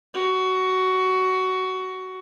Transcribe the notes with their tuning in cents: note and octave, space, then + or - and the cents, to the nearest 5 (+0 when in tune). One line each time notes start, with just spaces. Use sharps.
F#4 +15